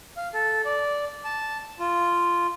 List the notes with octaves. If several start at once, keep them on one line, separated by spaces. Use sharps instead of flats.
F5
A4
D5
A5
F4